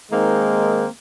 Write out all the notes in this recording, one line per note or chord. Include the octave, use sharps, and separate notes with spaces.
D#3 G#3 A#3 C4 D#4